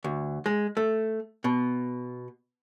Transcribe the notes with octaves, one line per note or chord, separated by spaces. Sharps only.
D2
G#3
A3
B2